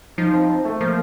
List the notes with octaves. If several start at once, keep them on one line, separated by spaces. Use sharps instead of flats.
F3 D#4
C4
C4
A3
F3 A#3